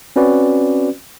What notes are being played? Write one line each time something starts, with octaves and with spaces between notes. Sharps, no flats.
C4 C#4 F#4 B4 D5